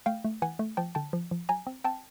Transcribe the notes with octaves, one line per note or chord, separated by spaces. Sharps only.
A3 F5 G5
A3
E3 F#5 G#5
A3
F3 G5 A5
D3 G5 A5
F3
F3
F#3 G#5 A#5
C4
C4 G5 A5